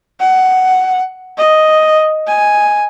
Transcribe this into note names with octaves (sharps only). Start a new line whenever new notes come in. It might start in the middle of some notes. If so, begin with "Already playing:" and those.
F#5
D#5
G#5